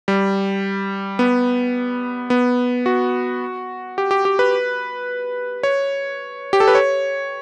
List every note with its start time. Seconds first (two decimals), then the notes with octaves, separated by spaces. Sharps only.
0.08 G3
1.19 B3
2.30 B3
2.86 F#4
3.98 G4
4.11 G4
4.25 G4
4.39 B4
5.63 C#5
6.53 G4
6.60 A4
6.68 B4
6.75 C#5